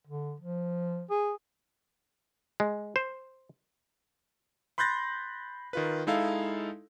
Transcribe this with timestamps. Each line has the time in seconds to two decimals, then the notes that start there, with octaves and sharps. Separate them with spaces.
0.07 D3
0.40 F3
1.10 G#4
2.60 G#3
2.96 C5
4.78 B5 C6 F#6 G6 A6 A#6
5.73 D#3 F4 B4
6.07 G#3 D#4 E4 A4 F5